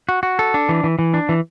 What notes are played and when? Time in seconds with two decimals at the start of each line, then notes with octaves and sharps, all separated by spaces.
0.09 F#4
0.23 F#4
0.39 A4
0.54 D4
0.69 E3
0.84 E3
0.99 E3
1.14 D4
1.29 E3